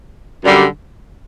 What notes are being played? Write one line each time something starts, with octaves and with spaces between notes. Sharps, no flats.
F#2 D3 G3